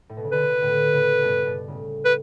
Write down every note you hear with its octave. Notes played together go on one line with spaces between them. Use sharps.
A2
B2
C#3
B2 D3 B4
A2 C#3
A2 C#3
G2 B2
G2 B2
A2 C#3
B4